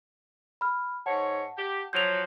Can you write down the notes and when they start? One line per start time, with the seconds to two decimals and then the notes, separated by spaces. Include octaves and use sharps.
0.61 B5 F6
1.06 G#2 C#5 F#5 A5
1.57 G4
1.93 F3 F#3 G6 F7